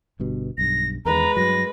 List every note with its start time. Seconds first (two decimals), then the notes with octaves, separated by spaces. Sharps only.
0.19 G1 G2 B2
0.58 B1 G2 A#6
1.05 E2 D#3 G#3 B4 A#5
1.36 G2 F#3 A#6